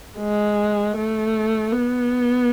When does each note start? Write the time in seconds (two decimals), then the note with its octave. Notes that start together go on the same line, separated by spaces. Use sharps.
0.18 G#3
0.96 A3
1.73 B3